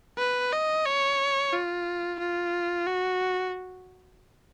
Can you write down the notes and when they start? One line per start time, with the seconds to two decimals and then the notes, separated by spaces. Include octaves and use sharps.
0.18 B4
0.53 D#5
0.86 C#5
1.53 F4
2.19 F4
2.86 F#4